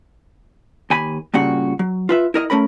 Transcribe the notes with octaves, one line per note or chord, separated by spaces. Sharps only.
D#2 G#5 B5
G2 A#2 C#3 F#4
F#3
F4 B4 E5
E4 A#4 D#5
A3 C#4 A#4 B5